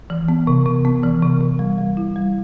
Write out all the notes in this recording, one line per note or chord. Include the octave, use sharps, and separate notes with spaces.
E3
B3
C3
C3
B3
E3
C3
C3
G3
G3
E4
G3